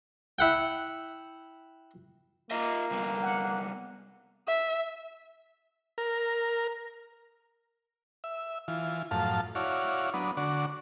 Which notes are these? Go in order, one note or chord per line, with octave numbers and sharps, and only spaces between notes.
E4 F#5 G5
A#3 F4 D#5 E5
C3 G3 B3
F#5
E5
A#4
E5
E3 F4
F#2 A2 F3 F5 A5
E4 F#4 C#5 D5 F5
F#3 B3 D4 D#6
D3 F#4 D5 C#6